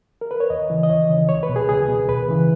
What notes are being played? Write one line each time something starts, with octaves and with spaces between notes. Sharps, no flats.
A#4
B4
C#5
D#2 D#5
C#3 E3
D#5
D#2 C#5
C#3 E3
C#2 C#5
B4
B2
G#4
C#2 G#4
B2
D#2 B4
C#3 E3